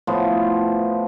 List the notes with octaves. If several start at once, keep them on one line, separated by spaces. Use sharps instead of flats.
A2 F3 B3